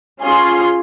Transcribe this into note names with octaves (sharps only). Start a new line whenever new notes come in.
C#4 F4 G#4 C6